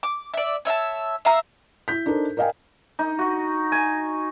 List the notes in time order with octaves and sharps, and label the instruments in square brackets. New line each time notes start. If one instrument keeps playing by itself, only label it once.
[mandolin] D6
D5 E5
C#5 E5 F5 A5
E5 F5 A#5 E6
[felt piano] E4 G6 B6
D4 D#4 A4 A#4 C5
A#4 D5 D#5 F5 G5 G#5
[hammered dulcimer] D#4
F#4
G#5